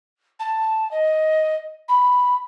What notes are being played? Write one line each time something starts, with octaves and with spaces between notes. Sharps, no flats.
A5
D#5
B5